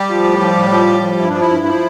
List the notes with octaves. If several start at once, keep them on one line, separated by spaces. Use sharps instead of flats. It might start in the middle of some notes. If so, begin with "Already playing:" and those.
Already playing: G3 G4
F3
A2
F3
A2
F3
A2
F3
G2 E4
F3 D4
E4
G2
F3